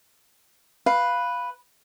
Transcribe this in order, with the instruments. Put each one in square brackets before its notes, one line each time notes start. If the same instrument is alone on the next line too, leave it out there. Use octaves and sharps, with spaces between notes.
[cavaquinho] B4 [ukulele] F5